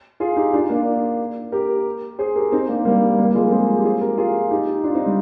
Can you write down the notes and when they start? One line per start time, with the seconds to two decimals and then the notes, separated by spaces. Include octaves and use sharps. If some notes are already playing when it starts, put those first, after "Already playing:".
0.20 F4 G#4
0.36 D#4 G4
0.53 D4 F4
0.69 A#3 D4
1.52 G4 A#4
2.19 G#4 C5
2.36 G4 A#4
2.52 C4 D#4
2.68 A#3 D4
2.85 G3 A#3
3.18 G3 A#3
3.29 A#3
3.35 F3 G#3
3.51 G#3 C4
3.77 G4
3.84 F4 G#4
4.01 G4 A#4
4.18 F4 G#4
4.51 D#4 G4
4.84 D4 F4
4.95 C4 D#4
5.06 G3